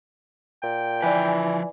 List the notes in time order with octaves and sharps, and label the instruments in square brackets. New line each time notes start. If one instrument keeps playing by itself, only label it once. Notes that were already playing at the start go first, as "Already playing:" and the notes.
[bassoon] A#2 [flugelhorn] G5
[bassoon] E3 [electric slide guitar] F3 B4 [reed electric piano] D5 G#5